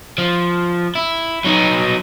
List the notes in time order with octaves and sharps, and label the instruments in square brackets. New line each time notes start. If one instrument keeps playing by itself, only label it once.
[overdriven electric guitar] F3
E4
F#3 D#4